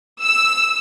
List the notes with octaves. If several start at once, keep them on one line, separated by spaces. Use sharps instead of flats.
E6